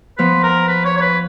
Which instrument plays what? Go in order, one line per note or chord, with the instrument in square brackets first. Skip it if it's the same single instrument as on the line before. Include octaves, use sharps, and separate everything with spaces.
[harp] F3 B3 F4 [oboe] B4
[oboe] A#4
B4
C#5
C#5
B4